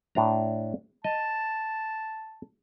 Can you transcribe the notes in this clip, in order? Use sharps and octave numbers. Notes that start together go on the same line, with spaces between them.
A2 D4 A#5
D#5 A5